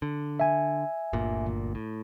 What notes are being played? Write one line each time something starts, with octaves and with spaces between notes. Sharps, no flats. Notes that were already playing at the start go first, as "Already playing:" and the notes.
D3
E5 G#5
G1 D2 A#2
A2